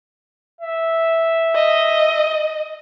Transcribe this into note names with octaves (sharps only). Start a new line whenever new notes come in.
E5
D#5